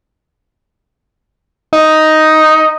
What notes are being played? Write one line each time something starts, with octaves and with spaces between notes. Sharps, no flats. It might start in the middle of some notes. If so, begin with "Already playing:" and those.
D#4